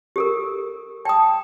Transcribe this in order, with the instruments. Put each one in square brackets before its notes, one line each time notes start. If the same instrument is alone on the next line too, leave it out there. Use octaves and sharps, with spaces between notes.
[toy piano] G4 A4 A#4
[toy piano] G5 D#6 [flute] A5